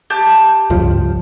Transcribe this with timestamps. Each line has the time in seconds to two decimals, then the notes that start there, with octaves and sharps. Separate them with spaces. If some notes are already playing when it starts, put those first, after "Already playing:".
0.10 G4 A5 G6
0.70 C#2 G2 F3